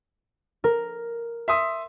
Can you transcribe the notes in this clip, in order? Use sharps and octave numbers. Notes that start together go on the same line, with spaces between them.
A#4
E5 C6 D#6